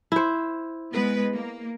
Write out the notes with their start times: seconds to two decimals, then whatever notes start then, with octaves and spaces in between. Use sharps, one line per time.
0.12 E4 C5
0.93 G#3 B3 B4
1.34 A#3